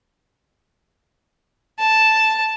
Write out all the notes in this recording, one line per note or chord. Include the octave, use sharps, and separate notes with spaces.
A5